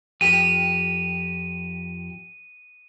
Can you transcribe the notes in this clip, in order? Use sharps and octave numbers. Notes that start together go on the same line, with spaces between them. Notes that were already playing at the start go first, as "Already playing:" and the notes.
F2 G4 D#7